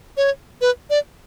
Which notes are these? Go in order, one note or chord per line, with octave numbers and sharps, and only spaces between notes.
C#5
B4
D5